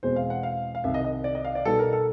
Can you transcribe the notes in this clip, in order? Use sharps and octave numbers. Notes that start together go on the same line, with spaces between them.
E2 B2 G#3 C4 C5
F5
F#5
F5
F5
C2 C3 D#3 E5
D#5
D#5
D5
D#5
F5
D5
B2 G3 B3 D#4 A4
A#4
A4